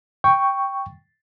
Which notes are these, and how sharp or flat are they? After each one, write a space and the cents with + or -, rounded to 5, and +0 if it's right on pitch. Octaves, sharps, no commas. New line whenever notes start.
G5 +0 C#6 +0